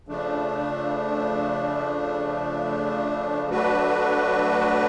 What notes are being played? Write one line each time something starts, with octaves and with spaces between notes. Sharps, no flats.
C#3 F3 A3 D4
F#3 A3 D4 F#4 B4